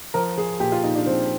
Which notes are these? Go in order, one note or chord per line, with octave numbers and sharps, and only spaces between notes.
F3 A#4
F3 G#4
A#2 G4
F4
A#2 D#4
D4
F3 C4